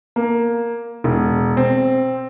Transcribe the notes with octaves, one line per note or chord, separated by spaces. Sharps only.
A#3
E1
C4